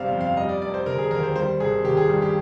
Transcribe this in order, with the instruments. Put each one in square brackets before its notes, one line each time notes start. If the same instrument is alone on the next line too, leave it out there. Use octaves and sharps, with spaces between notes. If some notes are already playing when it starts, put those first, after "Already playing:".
Already playing: [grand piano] G1 C3 G3 C5 D5 F5
F2
F5
G3 D#5
D5
F1 D5
C5
D3 A#4
G#4
D#2 A#4
C5
G3 C5
G#1 G#4
D#3 G4
G#4
G2
G4